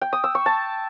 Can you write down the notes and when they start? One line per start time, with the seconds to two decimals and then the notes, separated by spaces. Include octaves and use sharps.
0.01 G5
0.13 D#6
0.24 E6
0.35 C#6
0.46 A5